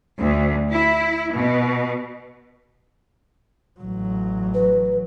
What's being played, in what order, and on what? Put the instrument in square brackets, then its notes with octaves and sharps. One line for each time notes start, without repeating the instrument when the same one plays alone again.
[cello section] D2
E4
B2
[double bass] A1 F#3
[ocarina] B4